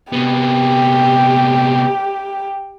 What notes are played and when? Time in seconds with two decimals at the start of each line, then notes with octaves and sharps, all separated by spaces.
0.13 C3 B3 G4